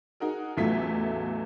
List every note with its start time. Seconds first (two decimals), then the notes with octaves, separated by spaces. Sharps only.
0.20 D#4 F#4 G#4 A#4
0.57 A1 E2 F#3 A3 F4 B6